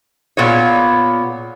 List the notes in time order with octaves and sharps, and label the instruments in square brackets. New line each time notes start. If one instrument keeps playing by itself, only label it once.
[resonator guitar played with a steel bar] A#2 B3 G#4 C#5